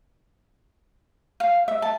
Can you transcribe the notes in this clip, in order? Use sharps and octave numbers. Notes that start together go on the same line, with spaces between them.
F5
E5
A5